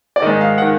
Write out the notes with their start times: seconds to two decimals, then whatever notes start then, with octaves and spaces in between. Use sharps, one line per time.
0.16 D5
0.22 G#2 D#3 D#5
0.41 F5
0.58 D#3 F#5